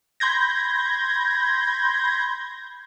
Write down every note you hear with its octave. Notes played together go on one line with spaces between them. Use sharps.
B5 C6 G6 G#6 A#6